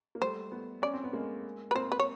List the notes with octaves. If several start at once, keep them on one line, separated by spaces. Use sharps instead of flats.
A#3
G3 A3 C5
A3 B3
C#4 D5
C4
B3
G#3 A#3
B4
A#3 C4 C5
B4
C#5